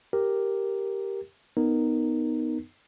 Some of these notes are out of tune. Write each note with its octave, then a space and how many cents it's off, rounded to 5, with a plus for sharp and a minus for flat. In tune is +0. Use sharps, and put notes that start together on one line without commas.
G4 +0 A#4 +0
B3 +0 D#4 -10 A#4 +0